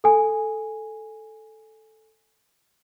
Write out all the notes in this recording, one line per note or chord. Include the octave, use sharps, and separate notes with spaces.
A4 G#5